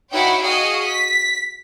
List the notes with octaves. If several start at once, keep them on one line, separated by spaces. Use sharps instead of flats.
D#4 E4 F#4 C#5 F#5 G5
F#4 G#4 D#5 F5
B6